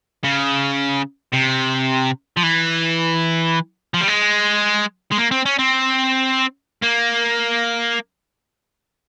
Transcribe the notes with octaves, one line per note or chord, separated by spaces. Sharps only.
C#3
C3
F3
E3
F3
G3
G#3
G#3
A#3
C4
C#4
C4
A#3